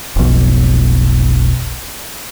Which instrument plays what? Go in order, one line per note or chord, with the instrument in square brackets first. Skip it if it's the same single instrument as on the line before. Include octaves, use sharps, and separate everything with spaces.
[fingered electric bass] F1 B1